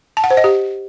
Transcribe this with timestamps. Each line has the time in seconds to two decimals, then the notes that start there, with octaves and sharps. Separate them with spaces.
0.17 A5
0.24 F#5
0.30 C5
0.37 D#5
0.44 G4